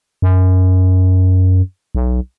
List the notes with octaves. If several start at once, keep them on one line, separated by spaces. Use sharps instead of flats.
F#2
B1